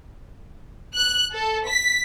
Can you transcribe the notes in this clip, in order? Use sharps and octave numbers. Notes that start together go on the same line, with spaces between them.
F#6
A4
B6